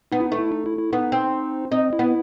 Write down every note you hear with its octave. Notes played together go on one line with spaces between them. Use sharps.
B3 D#4
E4
D#4
A3
E4
D#4
E4
E4
B3 D#4
C4
C4 D#4
E4
B3